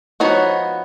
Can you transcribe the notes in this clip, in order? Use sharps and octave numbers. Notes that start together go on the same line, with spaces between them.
F3 B3 D#4 F#4 C#5